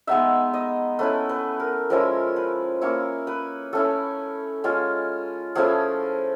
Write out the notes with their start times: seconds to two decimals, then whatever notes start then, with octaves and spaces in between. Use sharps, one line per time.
0.07 G#3 B3 D#4 E5
0.54 D#5
0.99 A3 C#4 E4 B4
1.29 B4
1.60 A#4
1.90 F3 G#3 C#4 E4 A#4
2.36 B4
2.81 A#3 C#4 E4 C#5
3.27 B4
3.73 A3 C#4 E4 A4
4.64 G#3 C#4 F4
5.55 F3 A3 C#4 E4 G#4